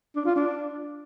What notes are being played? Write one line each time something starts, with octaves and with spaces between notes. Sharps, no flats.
D4
F4
D4